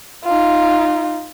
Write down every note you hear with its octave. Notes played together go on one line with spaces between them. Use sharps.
D#4 F4